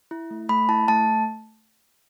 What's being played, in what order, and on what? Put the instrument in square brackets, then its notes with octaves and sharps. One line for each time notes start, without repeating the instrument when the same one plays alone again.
[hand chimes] E4
A3
A3 B5
E4 A5
A3 A5